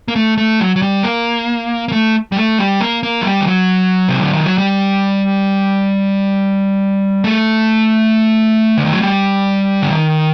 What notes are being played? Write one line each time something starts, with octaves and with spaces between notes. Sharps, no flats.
A#3
A3
A3
F#3
F#3
G3
A#3
A#3
A3
G3
A3
G3
A#3
A#3
F#3
G3
D#3
F#3
C3
D3
D#3
F#3
G3
A3
D3
D#3
F#3
G3
D3
D#3